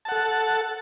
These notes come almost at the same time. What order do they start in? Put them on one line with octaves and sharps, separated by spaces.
A5 F#5 A4